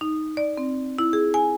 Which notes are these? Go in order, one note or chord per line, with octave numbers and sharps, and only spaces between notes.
D#4
D5
C4
E4
G#4
G#5